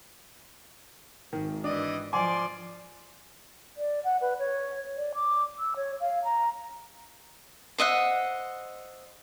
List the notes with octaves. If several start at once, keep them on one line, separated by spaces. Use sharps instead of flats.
G#1 D#3
E3 D4 D5 D#5
F3 D5 G#5 C6 D6
D5
F#5
B4
C#5
D5
D6
E6
C#5
F5
A#5
C5 D#5 E5 F#5